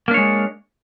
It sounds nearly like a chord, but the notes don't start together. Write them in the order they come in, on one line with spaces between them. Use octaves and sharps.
A#3 D4 C#5 G#3